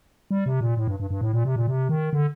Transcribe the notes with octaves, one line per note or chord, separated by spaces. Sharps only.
G3
C3
A#2
A2
G2
G2
G2
A2
A#2
C3
A#2
C3
D#3
D3